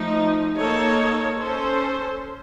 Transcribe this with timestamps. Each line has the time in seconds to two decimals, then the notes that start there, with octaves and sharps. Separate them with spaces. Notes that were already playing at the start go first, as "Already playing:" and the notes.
Already playing: F3 A3 D#4
0.59 A#3 D#4 A4 C#5
1.39 C#4 A4 C5